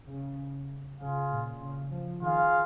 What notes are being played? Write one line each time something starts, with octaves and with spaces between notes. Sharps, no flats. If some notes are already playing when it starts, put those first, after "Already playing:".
C#3
C#3 F4 G#4 F5
A#2
C#3
F3
D#3 F4 G#4 F5